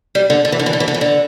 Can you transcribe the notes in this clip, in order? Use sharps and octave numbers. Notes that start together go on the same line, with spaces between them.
G3
D3
D3
E3
D3
E3
D3
E3
D3
E3
D3